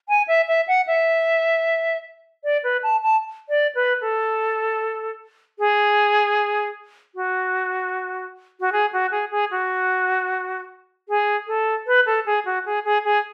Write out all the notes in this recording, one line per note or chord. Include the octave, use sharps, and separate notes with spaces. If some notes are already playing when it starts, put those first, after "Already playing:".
G#5
E5
E5
F#5
E5
D5
B4
A5
A5
D5
B4
A4
G#4
F#4
F#4
G#4
F#4
G#4
G#4
F#4
G#4
A4
B4
A4
G#4
F#4
G#4
G#4
G#4